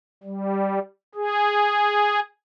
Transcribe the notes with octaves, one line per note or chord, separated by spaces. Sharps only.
G3
G#4